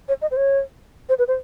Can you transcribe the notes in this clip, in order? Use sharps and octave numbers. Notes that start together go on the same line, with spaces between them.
C#5
D#5
C5
C#5
C5
B4
C5